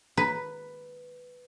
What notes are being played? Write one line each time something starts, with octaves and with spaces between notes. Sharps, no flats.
B4